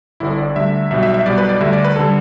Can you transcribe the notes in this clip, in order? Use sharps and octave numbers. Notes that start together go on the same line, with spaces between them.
G1 G2 D3 E4
D5
D2 D3 G3 E5
B1 B2 G3 E5
E5
E5
B1 B2 G3 D5
B4
D5
D2 D3 G3 E5
D5
B4
D3 G3 A4